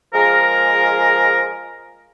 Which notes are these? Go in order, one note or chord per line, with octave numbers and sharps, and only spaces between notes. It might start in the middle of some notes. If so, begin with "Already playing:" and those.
F3 G#3 G#4 A#4